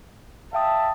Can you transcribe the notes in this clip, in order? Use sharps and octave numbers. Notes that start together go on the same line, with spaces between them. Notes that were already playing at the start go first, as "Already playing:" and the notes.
E5 F5 G5 A5 D#6